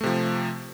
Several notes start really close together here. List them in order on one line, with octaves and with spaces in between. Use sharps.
A3 C3 F3